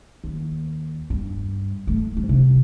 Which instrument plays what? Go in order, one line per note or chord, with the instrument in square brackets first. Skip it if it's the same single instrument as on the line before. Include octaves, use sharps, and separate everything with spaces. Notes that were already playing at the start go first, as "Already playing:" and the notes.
[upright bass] D#2
G2
A3
G2
C3